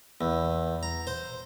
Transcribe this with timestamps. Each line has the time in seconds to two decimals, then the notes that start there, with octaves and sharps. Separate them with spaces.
0.21 E2
0.83 A#5
1.07 C5